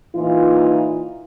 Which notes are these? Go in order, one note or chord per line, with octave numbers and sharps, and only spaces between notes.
A#2 E3 D#4 F4